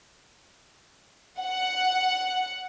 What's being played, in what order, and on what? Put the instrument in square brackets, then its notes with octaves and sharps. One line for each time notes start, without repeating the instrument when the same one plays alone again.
[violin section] F#5